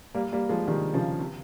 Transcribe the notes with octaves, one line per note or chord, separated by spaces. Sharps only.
G3 A#3
G3 A#3
F3 G#3
D#3 G3
C#3 F3
C3